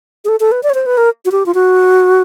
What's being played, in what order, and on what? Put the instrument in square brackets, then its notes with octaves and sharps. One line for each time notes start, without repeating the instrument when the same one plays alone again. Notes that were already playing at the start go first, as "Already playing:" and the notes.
[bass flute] G#4
A4
A4
B4
D5
C#5
C5
B4
A#4
F#4
G4
F4
F#4